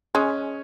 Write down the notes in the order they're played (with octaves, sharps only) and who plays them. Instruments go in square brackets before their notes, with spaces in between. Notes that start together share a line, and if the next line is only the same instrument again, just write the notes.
[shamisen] G#3 [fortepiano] C#4